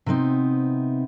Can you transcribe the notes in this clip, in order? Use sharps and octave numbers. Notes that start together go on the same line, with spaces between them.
C3 B3 C4 D#4